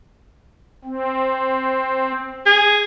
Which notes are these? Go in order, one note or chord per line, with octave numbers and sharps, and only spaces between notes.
C4
G#4